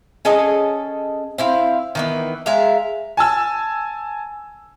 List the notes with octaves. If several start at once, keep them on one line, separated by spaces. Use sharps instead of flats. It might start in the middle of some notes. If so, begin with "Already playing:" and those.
C#4 G#4 A4 D#5
C4 E4 F5
D#3 E3 B3
G#3 E5 F5 A#5
G#5 A5 E6